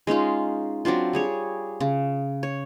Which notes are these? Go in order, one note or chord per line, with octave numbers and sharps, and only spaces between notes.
G#3 C#4 D#4 F4
F#3 C4 D4 F4
G3 G#4 C#5
C#3
C#5